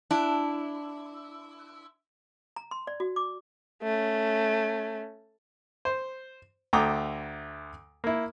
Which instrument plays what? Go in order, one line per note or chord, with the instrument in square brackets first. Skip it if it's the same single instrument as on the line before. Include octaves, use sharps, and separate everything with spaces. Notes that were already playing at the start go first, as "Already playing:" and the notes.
[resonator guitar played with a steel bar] D4 E4
[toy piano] A#5
C6
D5
F#4
D6
[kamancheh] A3 C#4
[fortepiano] C5
D2 A3 G5 A#5 D6 D#6
A#3 E4